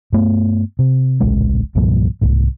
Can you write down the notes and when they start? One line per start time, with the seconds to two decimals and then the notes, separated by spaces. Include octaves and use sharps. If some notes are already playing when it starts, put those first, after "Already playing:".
0.13 G2 A3 B3
0.79 C3
1.20 D1 A#1 C#3 G#3
1.75 C2 G2 A#2 F3
2.21 C2 G#2